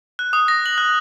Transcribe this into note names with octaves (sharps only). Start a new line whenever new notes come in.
F#6
D#6
A#6
F#7
F#6